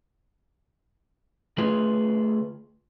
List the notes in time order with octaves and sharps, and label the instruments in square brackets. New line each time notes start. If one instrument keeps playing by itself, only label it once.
[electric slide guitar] D3 A3 F4 G#4 B4